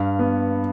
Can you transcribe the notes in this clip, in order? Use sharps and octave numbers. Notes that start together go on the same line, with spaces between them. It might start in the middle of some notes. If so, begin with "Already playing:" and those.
Already playing: G2 F5
B3